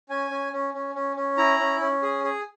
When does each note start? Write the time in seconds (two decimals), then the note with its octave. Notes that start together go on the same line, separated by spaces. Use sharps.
0.09 C#4 G#5
0.30 C#4
0.53 C#4
0.74 C#4
0.95 C#4
1.16 C#4
1.37 E4 A#5
1.59 C#4
1.80 C#4
2.03 G#4
2.24 G#4